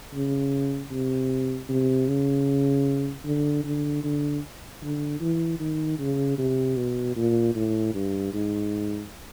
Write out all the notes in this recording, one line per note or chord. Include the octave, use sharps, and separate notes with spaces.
C#3
C3
C3
C#3
D3
D3
D3
D3
E3
D#3
C#3
C3
B2
A#2
A2
G2
G#2